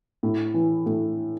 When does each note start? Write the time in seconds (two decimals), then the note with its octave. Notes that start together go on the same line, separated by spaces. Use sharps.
0.23 A2
0.54 E3
0.86 A2